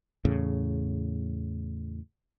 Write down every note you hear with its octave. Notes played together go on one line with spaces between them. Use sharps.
E2 A2 C#3